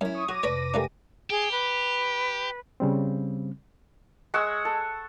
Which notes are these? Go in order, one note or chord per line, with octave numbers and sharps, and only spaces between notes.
F#2 C#4 E4
C#6 D#6
F#3 F#4 D6 A#6 D#7
F2 C3 B4 C#5 D5 B5
A3 A#3 D4 G4 G5 G#5
G4 G#4
B4
C#3 G3 C4
G#3 F#5 C#6 E6
A4